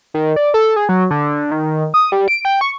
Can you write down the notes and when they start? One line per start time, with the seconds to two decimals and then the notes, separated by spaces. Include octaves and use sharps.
0.14 D#3
0.36 D5
0.54 A4
0.76 G#4
0.89 F#3
1.11 D3
1.51 D#3
1.94 D#6
2.12 G3
2.28 D7
2.45 G5
2.61 C#6